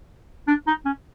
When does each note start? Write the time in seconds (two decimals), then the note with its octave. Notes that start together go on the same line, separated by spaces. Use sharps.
0.48 D4
0.67 D#4
0.85 C#4